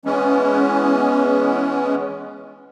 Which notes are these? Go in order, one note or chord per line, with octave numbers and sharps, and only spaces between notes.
E3 G#3 B3 C#4